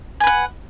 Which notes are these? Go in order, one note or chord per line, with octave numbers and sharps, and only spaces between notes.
B4 F#5 G#5